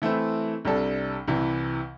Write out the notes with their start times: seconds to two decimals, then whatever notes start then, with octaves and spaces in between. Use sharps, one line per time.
0.02 E3 A3 C4 E4
0.65 C2 C3 G3 D4 A4
1.28 C2 C3 E3